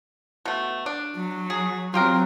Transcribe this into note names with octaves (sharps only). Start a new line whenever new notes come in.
B2 A3
D4
F#3
G#4
F#3 C4 F4 G4 A#4